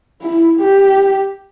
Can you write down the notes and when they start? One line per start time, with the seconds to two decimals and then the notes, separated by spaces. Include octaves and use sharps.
0.22 E4
0.60 G4